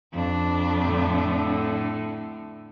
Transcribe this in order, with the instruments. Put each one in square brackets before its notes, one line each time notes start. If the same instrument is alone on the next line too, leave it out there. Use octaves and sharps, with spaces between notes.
[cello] F2 D4
[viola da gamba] A2 D3